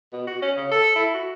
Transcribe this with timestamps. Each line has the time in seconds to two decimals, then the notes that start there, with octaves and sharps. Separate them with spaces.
0.13 B2
0.27 F#4
0.42 C#4
0.57 C#3
0.71 A4
0.96 E4
1.14 F#4